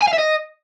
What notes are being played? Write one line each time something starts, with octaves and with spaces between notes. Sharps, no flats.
G#5
F5
E5
D#5